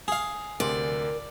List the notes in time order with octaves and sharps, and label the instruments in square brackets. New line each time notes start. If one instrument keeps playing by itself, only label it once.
[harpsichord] G#4 F5
[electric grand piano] D2 C3 C6 [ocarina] A#4 [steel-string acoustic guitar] D5